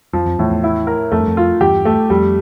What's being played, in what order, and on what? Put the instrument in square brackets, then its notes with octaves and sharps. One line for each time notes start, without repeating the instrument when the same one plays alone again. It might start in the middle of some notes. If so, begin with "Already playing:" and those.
[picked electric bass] F2 [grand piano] F3
[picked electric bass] F2
[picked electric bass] E2 [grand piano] A2
[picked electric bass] E2
[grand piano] E4
A#4
[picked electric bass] F2 [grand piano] A3
[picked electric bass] G2
F2
[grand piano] F4
[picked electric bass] E2 G2 [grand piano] G4
[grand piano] A3
[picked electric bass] F2 [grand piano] G3